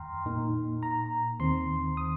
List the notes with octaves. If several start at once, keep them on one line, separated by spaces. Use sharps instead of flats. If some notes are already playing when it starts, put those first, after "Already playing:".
Already playing: F2 D#3 G5 A#5 C6 F6
A#2 A#3 D#4
A#5
D#2 D#3 C4 C6
D#6